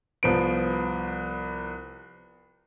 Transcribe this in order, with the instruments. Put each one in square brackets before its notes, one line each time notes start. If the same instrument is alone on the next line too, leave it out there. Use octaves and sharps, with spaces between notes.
[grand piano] C2 F3 B3 D7